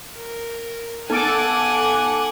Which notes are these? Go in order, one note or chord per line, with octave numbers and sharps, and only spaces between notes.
A#4
B3 D#4 A4 F#5 G#5 D6